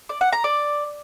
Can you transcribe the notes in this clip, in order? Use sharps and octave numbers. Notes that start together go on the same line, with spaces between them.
D5
F#5
A#5
D5